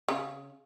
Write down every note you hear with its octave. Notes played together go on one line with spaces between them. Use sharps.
C#3